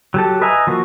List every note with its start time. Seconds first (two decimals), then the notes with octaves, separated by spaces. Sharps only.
0.14 F#3 G4 A4
0.42 B4 D#5 E5 G#5 A#5
0.67 F3 A#3 F#4